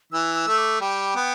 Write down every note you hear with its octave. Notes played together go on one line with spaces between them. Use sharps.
E3 E6
E6
A3
D6
G3 G5
B3